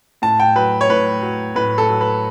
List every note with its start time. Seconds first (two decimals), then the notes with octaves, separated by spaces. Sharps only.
0.22 A2 A5
0.40 G5
0.55 F#3 B4
0.81 C#5
0.89 A2 B4
1.22 F#3
1.55 A2 B4
1.78 A4
1.89 F#3
2.01 B4